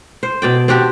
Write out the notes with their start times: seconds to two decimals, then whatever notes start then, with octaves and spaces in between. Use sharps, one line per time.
0.23 C5
0.42 B2 D5 G5
0.68 C4 D4 F#4 G4